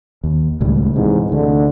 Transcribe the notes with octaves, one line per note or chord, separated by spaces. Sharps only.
D#2
C#2 A2 G3
G#2 C3 E3
D2 D3